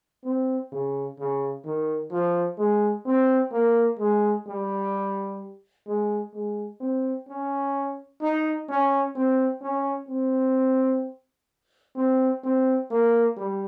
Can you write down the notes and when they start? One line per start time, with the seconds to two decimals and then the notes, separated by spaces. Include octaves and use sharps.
0.25 C4
0.72 C#3
1.19 C#3
1.65 D#3
2.11 F3
2.58 G#3
3.06 C4
3.52 A#3
3.99 G#3
4.47 G3
5.87 G#3
6.34 G#3
6.80 C4
7.28 C#4
8.22 D#4
8.69 C#4
9.15 C4
9.62 C#4
10.09 C4
11.96 C4
12.44 C4
12.91 A#3
13.37 G3